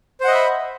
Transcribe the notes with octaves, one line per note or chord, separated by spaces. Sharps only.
C5 D#5 E5 F#5 B5